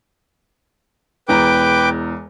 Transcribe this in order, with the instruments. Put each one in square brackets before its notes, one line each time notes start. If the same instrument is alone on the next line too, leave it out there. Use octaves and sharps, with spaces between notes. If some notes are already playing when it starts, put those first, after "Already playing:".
[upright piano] E1 E2 A#5 [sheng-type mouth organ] B4 G5 D6